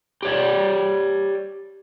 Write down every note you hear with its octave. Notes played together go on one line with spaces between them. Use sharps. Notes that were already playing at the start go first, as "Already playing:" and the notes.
G4 C#5 D5